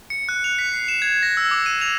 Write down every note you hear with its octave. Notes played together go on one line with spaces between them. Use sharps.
C#7
F#6
F7
B6
C7
E7
G#6
A#6
E6
D6
D#7
F7